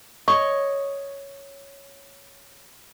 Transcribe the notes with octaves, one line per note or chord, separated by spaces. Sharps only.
C#5 D#5 C#6